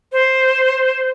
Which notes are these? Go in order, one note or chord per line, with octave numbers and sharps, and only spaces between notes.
C5